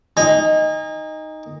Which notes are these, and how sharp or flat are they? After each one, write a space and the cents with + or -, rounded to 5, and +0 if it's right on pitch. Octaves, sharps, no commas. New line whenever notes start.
D#4 +0 G#5 -40